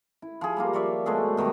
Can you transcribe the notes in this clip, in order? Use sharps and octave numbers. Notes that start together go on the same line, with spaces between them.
E4
F3 G#4
G3 A#3 F4
F3 C#5 D5 E5
B2 G#3 A3 G#4
B2 D#3 F#3 G3